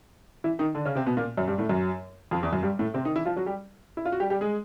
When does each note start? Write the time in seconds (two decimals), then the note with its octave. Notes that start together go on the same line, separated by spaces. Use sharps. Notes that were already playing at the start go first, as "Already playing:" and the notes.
0.44 E3 E4
0.59 D#3 D#4
0.75 D3 D4
0.85 C#3 C#4
0.95 C3 C4
1.06 B2 B3
1.17 A#2 A#3
1.37 F#2 F#3
1.48 G2 G3
1.58 A2 A3
1.69 F#2 F#3
2.31 F2 F3
2.42 E2 E3
2.52 F#2 F#3
2.63 G2 G3
2.79 A2 A3
2.94 C3 C4
3.05 D#3 D#4
3.16 E3 E4
3.25 F3 F4
3.36 F#3 F#4
3.46 G3 G4
3.97 E4
4.05 F4
4.12 F#4
4.20 G3 G4
4.30 G3 G4
4.41 G#3 G#4